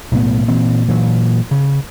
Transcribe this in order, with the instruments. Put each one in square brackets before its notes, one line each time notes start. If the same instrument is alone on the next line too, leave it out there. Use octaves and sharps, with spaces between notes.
[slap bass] B1 A2 B3
A#2 E3 C4
A#2 E3 F#3
C#3